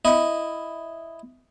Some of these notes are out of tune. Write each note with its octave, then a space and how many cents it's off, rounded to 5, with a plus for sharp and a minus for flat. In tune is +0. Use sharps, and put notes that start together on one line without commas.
E4 +0 D#5 +0